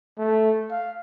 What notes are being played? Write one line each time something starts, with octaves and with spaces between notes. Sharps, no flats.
A3
F5